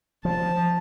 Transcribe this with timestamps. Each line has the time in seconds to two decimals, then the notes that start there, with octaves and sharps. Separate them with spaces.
0.25 F3 A5